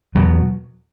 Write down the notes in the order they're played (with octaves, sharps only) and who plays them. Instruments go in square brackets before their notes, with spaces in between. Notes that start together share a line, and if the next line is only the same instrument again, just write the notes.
[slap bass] E2 B2 F#3